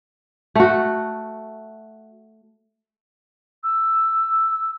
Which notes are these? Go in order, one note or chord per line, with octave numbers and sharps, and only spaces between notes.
A3 F#4
E6